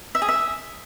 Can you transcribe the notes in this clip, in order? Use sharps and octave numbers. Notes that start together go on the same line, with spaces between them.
E5
G#4
E5